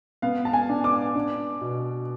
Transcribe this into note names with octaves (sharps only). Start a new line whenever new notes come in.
B3 F5
A5
G#5
D4
D6
D4
B2